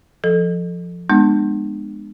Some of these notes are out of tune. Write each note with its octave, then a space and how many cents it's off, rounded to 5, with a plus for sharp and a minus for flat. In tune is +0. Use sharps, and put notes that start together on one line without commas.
F3 +0 A4 +0
G#3 +0 B3 +0 D4 +45